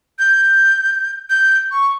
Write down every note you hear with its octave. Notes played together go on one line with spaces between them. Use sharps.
G6
G6
C#6